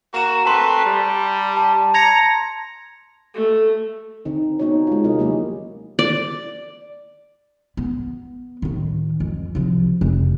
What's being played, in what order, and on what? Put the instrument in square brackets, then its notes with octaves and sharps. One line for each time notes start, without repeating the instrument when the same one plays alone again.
[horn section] A#3 F#4 [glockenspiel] A#5 E7
[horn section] A3 C4 B4 [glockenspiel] A5 C6
[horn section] G3
[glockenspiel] A5
[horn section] A#5 [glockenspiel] G#6 A#6 C#7
[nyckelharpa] A3
[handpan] D3 C4 D#4
B3 C#4 D#4 F#4 C#5
G#3 F4
C3 C#4 E4 F4 A#4 D#5
F3 F#3 A#3 G4
[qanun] D5
[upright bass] B3
A2 D#3
F2
C2 F3
F1